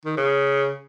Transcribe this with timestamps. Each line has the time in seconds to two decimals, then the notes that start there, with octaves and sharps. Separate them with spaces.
0.05 D#3
0.17 C#3